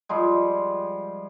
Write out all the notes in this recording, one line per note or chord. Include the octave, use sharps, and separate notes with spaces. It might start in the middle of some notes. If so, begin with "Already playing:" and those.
F3 G3 G#3